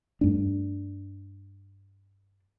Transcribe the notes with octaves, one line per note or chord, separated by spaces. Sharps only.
G2 A3 D4